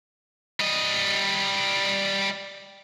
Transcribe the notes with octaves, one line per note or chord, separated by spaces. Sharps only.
G3 D#5